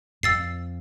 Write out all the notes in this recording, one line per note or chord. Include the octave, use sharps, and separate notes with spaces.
F2 E6 A6 C7